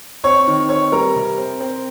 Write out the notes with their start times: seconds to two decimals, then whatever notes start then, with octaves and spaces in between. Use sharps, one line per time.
0.24 C4 C#5 C#6
0.47 D#3
0.69 C4 C#5 C#6
0.92 G3 A#4 A#5
1.16 C3
1.38 C4
1.61 C4